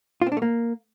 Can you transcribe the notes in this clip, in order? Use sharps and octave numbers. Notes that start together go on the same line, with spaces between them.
F4
C4
D4
A3
A#3